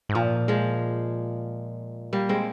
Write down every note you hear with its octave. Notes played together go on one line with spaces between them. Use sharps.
G#2
A#2 F3
F3 G#3
G3 A#3
G#3 C4